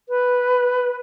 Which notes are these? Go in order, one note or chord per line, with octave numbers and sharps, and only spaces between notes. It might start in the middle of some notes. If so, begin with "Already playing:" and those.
B4